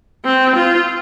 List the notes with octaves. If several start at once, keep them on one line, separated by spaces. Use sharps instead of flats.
C4
F4